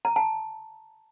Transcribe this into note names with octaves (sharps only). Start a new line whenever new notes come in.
A#5
A5